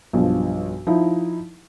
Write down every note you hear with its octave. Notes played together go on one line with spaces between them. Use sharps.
B1 G2 F3
F3 D#4 E4